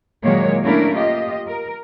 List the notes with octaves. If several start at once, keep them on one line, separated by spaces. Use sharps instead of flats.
A#2 D#3 F#3 G#3 A#3 C#5
A3 A#3 C#4 D4 E4 A#4
F4 G4 D#5
A#4